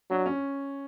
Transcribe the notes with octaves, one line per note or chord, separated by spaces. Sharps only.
F#3 D4
C#4